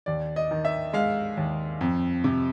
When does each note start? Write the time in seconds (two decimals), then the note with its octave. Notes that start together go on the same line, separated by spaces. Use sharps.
0.06 D#2 D5
0.36 D#5
0.51 D#3
0.65 E5
0.93 G#3 F5
1.37 D#2
1.81 F2
2.24 C3